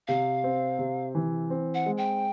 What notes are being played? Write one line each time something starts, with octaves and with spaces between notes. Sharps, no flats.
C3 F5
C4
C3
E3
C4
F#5
G#3
G5